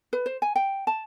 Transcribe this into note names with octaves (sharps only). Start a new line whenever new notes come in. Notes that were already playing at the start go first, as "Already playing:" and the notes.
B4
C5
G#5
G5
A5